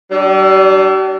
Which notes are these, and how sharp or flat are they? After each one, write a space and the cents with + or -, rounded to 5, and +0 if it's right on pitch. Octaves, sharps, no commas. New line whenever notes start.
G3 -45 D4 +0